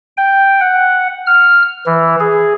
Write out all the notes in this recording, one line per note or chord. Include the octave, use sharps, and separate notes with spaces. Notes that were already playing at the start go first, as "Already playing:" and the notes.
G5
F#5
F6
E3
G#4